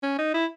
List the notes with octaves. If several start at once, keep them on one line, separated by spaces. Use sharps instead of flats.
C#4
D#4
E4